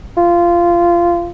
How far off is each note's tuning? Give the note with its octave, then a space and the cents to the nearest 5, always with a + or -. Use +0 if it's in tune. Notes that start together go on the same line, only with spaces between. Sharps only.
F4 -15